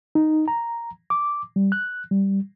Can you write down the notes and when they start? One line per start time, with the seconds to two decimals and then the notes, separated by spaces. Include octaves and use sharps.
0.15 D#4
0.48 A#5
1.10 D6
1.56 G3
1.72 F#6
2.11 G3